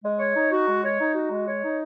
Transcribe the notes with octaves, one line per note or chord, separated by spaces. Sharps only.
G#3
C#5
D#4
F#4
G#3
C#5
D#4
F#4
G#3
C#5
D#4